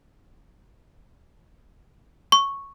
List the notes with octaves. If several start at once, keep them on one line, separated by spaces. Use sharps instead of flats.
C#6